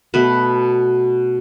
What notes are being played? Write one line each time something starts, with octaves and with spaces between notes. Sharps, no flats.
B2 A3 B4